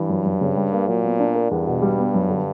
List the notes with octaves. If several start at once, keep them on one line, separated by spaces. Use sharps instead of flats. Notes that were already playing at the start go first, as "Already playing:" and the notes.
Already playing: G2 E3
F#2
F#2
C#3
G3
A#3
A#2 F#3
B3
D4
A#4
E2 G2
B2
G3
B3
F#2
D3